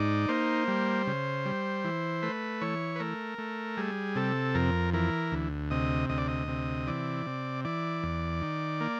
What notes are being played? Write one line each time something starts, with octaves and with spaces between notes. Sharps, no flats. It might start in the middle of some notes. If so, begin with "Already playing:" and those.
Already playing: G#2 D#4 D5
A#3 C5
G3
C#3
G3
E3
A3 B4
E3 C#5
B4
A3 A#4
A3
G3 G#4
C3 A4
F2 A#4
E3 A#4
D2
C3 D#5
D2 D#5
D5
D#5
C3
E3 D5
C3
E3 D5
E2
D#3
A#3